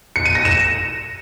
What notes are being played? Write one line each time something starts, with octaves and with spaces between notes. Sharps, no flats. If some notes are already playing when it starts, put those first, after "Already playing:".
C#7
D#7
A#6
E7